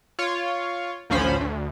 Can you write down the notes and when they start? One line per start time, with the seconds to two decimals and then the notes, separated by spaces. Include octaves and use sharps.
0.19 F4 C#5
1.10 A1 D2 F3 C#4 C5 B5
1.41 D2